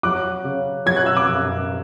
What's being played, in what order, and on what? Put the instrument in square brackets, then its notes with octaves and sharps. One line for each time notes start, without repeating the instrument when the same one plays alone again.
[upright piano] F#3 D6 F#6
C#3
F#3 G#6
F#6
E6
D6 F#6
F#2